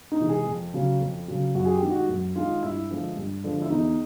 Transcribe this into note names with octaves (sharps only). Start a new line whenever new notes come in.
D#4
C3 E3 G#3
G#4
F2
C#3 F#3
F2
C#3 F#3
F#2 F#4
G#4
G4
D#3 G#3
F#4
F#2
D#3 G#3 F4
G2 E4
D3 F3 G#3
G2
D3 F3 G#3
E4
E2 D#4